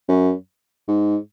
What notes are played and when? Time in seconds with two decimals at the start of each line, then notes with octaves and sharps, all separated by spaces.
0.09 F#2
0.88 G#2